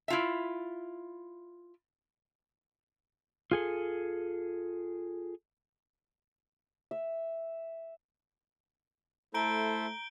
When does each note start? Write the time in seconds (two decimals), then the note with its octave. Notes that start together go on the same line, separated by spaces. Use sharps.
0.08 E4 F4 E5
3.51 F4 G#4 A4
6.91 E5
9.34 A3 E4 A4 C5 A#5 G6 D7 G7